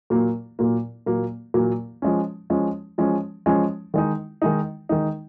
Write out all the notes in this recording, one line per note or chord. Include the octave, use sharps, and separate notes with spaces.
A#2 F#3 A#3
A#2 F#3 A#3
A#2 F#3 A#3
A#2 F#3 A#3
F3 G#3 C#4
F3 G#3 C#4
F3 G#3 C#4
F3 G#3 C#4
D#3 G#3 D#4
D#3 G#3 D#4
D#3 G#3 D#4